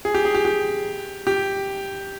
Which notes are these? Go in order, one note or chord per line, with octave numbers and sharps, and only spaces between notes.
G#4
G4
G#4
G4
G4
G4